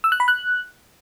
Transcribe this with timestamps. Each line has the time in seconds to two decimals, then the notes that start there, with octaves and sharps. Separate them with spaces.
0.04 E6
0.12 F#6
0.20 B5
0.28 F#6